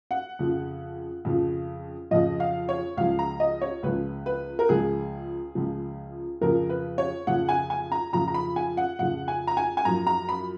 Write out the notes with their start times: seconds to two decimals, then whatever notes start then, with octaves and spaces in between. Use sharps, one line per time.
0.11 F#5
0.39 F2 C#3 F3
1.25 F2 C#3 F3
2.11 F2 C#3 F3 D#5
2.40 F5
2.69 C#5
2.97 C#2 C#3 F3 F5
3.19 A#5
3.40 D#5
3.62 C#5
3.83 C#2 C#3 F3 B4
4.26 B4
4.59 A#4
4.69 C#2 C#3 F3 G#4
5.55 C#2 C#3 F3
6.41 F2 C#3 F3 A#4
6.69 B4
6.98 C#5
7.27 F2 C#3 F3 F#5
7.49 G#5
7.70 G#5
7.92 A#5
8.13 F2 C#3 F3 A#5
8.28 A#5
8.34 B5
8.56 G#5
8.77 F#5
8.99 F2 C#3 F3 F#5
9.28 G#5
9.47 A#5
9.57 G#5
9.77 G#5
9.85 F#2 F3 A#5
10.07 A#5
10.29 B5